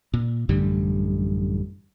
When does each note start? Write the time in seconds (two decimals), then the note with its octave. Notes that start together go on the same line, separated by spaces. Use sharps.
0.14 A#2
0.49 A1 F#2 D3 G3